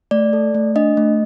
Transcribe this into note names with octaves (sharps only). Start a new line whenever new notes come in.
A3 D5
A4
A3
D4 D#5
A3